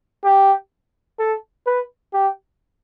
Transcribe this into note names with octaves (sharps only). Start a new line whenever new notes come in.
G4
A4
B4
G4